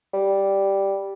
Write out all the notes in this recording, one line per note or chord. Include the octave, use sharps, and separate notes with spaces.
G3